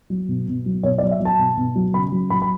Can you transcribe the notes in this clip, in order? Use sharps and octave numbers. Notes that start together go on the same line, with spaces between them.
F#3
B2
B2
F#3
B2 C#5
D5
F#3
E5
F#3
A5
B2
B2
F#3
C#3 B5
F#3
F#3 B5
B5